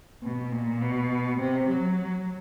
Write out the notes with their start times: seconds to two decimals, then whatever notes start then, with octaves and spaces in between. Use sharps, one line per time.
0.23 B2
0.52 A#2
0.81 B2
1.39 C3
1.68 F#3